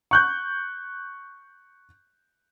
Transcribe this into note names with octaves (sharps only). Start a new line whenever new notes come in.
C#6 F#6 G6